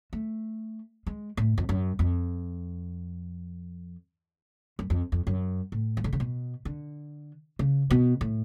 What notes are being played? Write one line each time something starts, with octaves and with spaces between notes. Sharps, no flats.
A3
G#3
A2
F2
F#2
F2
F#2
F2
F2
F#2
A2
F3
D3
C#3
B2
D3
C#3
B2
A2